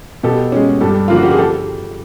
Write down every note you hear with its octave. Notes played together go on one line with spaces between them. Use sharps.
B2 G4 A4
G#3 C#4
G2 G4 A4
D3 F3 A#3 F4
F#4
G4
G#4
G4 A4